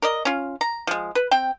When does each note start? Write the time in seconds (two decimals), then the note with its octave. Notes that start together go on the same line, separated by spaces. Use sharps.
0.02 A#4 D5 D#5
0.25 C#4 F4
0.61 A#5
0.87 F3 G#3
1.15 B4
1.31 C4 G5